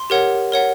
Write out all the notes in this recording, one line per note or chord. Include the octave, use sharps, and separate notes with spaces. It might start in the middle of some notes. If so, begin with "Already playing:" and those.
Already playing: C6
G4 A#4 C#5 F#5
A#4 C#5 F#5